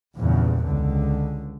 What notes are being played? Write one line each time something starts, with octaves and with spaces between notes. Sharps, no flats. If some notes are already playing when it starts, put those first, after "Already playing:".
A#1 E2 G2 C#3
C#2 D3